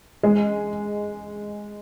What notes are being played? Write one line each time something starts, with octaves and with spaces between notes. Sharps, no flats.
G#3